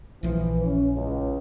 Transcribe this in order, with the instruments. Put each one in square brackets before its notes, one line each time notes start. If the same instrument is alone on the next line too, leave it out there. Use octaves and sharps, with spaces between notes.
[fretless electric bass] A#1 F3 [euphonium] E3
[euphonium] C#4
C#2